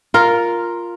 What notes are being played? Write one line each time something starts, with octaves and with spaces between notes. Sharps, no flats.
F4 A#4